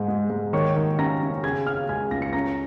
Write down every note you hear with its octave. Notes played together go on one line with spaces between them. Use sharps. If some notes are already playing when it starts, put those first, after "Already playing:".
Already playing: G#2 D#4
G#3
G#2
D#3 C#5 C#6
D#3
C#4 A#5 A#6
C#4
C#3 G#5 G#6
C#3 F5 F6
G#3 G#5 G#6
C#2 A#6
C#7
C#4 A#5 A#6